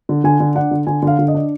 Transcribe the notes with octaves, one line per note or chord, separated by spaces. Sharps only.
D3
D3 G#5
D3
D4 F#5
D3
D3 G#5
D3 F5
D3
D#5
D4